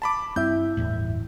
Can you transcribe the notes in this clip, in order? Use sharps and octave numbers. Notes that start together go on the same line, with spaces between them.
A5 B5 D6
G2 C4 E4 E5 G6
G1 E2 A2